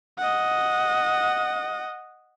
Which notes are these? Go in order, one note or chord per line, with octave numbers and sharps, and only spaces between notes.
D#5 F#5